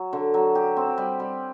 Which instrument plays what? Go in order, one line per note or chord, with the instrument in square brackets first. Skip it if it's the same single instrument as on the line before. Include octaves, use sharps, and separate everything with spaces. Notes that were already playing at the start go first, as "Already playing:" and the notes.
Already playing: [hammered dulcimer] F#3
D3
F#3
G4
C4
G3
G3